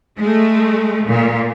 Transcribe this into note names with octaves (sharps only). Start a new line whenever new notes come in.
G#3 A3
A#2